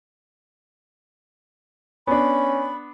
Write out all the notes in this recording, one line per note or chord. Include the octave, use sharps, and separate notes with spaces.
B3 C#4 D4 B5